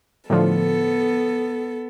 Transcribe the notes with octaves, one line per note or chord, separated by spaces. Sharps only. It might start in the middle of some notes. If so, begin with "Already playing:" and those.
A2 D3 F3 B3 A4